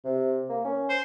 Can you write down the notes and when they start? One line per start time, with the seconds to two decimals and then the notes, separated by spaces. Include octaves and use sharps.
0.05 C3
0.49 A#3
0.65 C#4
0.90 C5